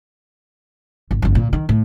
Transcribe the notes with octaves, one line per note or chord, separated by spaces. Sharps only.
G#1
G1 F2
A#2
D#3
A2